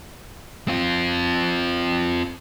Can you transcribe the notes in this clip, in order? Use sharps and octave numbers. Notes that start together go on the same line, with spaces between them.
C4 F4